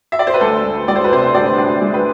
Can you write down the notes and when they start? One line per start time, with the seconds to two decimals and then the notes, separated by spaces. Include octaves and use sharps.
0.12 E5
0.19 D5
0.27 C5
0.34 B4
0.41 D2 A4
0.65 D2
0.88 G#3 D5
0.96 C5
1.04 B4
1.11 C3 C4 C5
1.34 D2 D4 D5
1.58 D2 D4 D5
1.81 G#3
1.94 B4